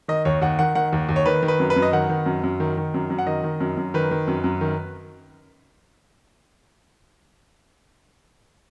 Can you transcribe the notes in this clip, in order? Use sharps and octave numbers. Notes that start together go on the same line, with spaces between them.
D#3 D#5
D#2 C#5
D#2 F#5
D#3 F#5
D#3 F#5
D#2
D#2
C#5
D#3 B4
D#3
B4
F#2
B4
F#2
D#5
D#3 F#5
D#3
F#2
F#2
D#3
D#3
F#2
F#2
F#5
D#3 D#5
D#3
F#2
F#2
D#3 B4
D#3
F#2
F#2
D#3